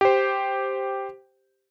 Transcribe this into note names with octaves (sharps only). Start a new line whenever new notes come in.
G4 C5